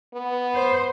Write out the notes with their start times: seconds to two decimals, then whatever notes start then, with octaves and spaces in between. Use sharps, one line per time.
0.14 B3
0.53 C5